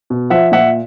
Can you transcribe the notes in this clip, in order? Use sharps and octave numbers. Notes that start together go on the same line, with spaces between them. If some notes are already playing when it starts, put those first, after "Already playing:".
B2
F3 E5 F#5
A#2 E5 F#5